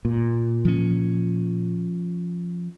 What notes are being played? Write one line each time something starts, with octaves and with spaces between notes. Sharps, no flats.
A#2
F3 C#4